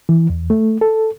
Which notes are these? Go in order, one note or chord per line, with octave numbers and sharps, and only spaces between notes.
E3
E2
A3
A4